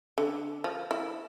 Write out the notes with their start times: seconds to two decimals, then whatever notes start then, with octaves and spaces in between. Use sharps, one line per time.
0.18 D3
0.64 F3
0.91 E4